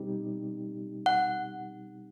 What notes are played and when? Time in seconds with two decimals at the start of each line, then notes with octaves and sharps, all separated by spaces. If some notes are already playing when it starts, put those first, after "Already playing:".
Already playing: B2 G3 C4 D#4 G4
1.06 F#5